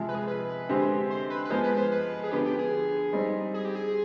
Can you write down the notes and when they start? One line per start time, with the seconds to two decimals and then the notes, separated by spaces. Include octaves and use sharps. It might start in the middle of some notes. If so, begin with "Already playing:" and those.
Already playing: C3 F3 G#3
0.08 B4
0.15 G#4
0.28 B4
0.69 D3 G#3 C4 G4
1.10 C5
1.30 B4
1.45 B4
1.50 F3 G#3 B3 C5
1.64 B4
1.77 C5
1.92 B4
2.24 G#4
2.31 D3 F3 B3 G4
2.45 G4
2.59 G#4
3.13 G3 C4 D#4
3.54 G#4
3.65 G4
3.75 G#4